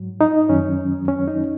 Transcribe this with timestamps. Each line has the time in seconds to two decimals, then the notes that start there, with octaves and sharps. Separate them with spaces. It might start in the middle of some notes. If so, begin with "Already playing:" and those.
Already playing: G#2 F#3
0.21 D#4
0.49 F#2 D#3 F#3 C#4
1.08 C#4
1.27 D#4